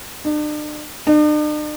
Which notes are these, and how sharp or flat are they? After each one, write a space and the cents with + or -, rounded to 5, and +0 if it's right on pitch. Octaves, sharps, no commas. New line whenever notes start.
D4 +40
D4 +45